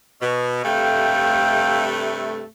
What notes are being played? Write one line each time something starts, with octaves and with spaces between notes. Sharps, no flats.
B2
G2 C3 A3 F5 G5